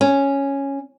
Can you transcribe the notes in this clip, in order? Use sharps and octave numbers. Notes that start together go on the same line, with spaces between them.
C#4